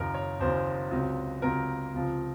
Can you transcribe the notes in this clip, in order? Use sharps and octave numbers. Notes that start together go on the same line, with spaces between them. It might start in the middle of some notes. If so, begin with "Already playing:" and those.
Already playing: F#1 F#2 D#3 A#4
C#5
F#1 F#2 D#3 C5
C#2 C3 F#3
C#2 C3 F#3 A#4
C#2 C3 F3